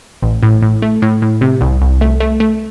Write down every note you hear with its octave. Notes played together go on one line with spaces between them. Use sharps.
A1
A2
A2
A3
A2
A2
C3
C2
C2
A3
A3
A3